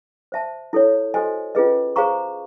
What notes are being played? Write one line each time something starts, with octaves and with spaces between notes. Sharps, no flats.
C5 E5 A5
E4 A4 C#5
F#4 A4 C5 D#5 G#5
C#4 F4 G#4 B4 D#5
G#4 C5 F5 A#5 C#6